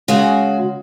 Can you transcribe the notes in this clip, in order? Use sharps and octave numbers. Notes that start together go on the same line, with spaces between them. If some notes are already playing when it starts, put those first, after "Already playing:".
C#3 G#3 F#4